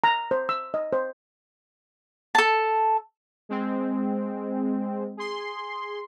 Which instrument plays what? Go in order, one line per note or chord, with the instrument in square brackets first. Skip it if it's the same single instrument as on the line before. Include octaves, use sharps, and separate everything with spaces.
[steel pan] A#5
C5
E6
D#5
C5
[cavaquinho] A4 A5
[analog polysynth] G#3 C4
G#4 C6